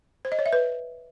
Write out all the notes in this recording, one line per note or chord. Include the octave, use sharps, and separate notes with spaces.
C5
D#5
C#5
E5
B4